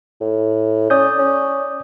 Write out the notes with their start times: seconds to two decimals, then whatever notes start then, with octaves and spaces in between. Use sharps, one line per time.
0.21 A2
0.90 C#4 D5 D#6 G6
1.19 C#4